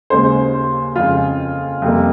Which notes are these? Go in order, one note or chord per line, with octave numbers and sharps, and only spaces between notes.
D#2 C#3 G#3 C5
F2 C#3 G#3 F4
F2 C3 G3 A#3